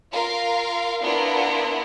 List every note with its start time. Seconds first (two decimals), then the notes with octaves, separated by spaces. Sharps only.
0.11 F4 A#4 F5
1.01 B3 D4 E4 F4 A#4